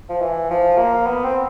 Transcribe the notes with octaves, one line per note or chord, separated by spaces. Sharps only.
F3
E3
F3
A#3
B3
C4